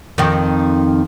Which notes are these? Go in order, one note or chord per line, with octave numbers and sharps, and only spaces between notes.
F2 D#3